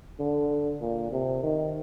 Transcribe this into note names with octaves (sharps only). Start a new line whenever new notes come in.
D3
A#2
C3
D#3